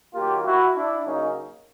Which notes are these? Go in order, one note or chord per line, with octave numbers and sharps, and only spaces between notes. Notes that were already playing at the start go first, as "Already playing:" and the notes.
D#3 F#3 A#3 F4 G4
E4 F#4
D4 E4
C#3 F#3 A#3 C#4 D#4